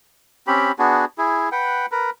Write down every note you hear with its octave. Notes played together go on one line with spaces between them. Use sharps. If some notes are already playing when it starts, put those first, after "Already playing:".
C4 C#4 G4 B5
B3 D4 F#4 G#4
E4 G#4
B4 F#5 G5
A#4 B4